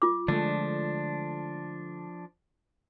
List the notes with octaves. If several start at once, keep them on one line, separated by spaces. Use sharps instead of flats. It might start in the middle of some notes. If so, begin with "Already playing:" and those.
F4 D6
D3 F3 G#3 A3 D4